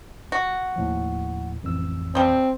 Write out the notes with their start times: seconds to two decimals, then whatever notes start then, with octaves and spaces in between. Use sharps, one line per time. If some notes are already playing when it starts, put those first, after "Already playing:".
0.32 F#4
0.76 D#2 A2 F3
1.63 A1 F2 E6
2.15 F3 G3 C4